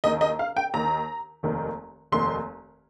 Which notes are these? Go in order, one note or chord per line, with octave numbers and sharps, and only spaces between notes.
D#2 D#3 D#5
D#5
F5
G5
D#2 D#3 A#5
F1 D#2 D#3
F1 D#2 D#3 C6